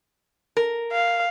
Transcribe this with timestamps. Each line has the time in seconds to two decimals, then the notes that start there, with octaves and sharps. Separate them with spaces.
0.57 A#4
0.92 F5